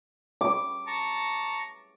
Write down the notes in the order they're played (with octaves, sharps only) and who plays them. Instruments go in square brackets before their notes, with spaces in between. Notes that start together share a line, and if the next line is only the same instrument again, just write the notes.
[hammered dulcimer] D6
[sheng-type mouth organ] A5 A#5 C#6